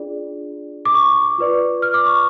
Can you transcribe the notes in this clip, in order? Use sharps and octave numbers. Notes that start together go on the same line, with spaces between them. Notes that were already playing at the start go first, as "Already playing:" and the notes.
Already playing: D4 F4 G#4 D5
D6
C#6
F4 B4 D5
F6
D6
C#6